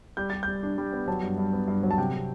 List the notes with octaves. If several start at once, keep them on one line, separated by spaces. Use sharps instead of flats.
G3 G6
G3 A6
G3 G6
D4
G3
B3
F#3 A5
G2
G2
B3
G2
F#3
A5
C3 G5
C3